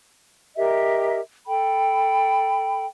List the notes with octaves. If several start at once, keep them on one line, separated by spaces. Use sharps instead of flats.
G4 A#4 D#5 E5
A4 G5 B5